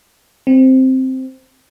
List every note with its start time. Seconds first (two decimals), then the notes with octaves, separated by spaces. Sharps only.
0.47 C4